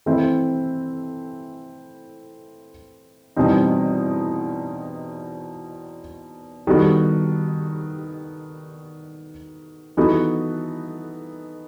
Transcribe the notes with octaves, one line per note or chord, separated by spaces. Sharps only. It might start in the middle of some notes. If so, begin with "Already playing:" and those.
E3 A3 C4 E4
E2 B2 G3 C4 D#4
D#3 G3 B3 F#4 A4
E3 B3 D#4 F#4 A4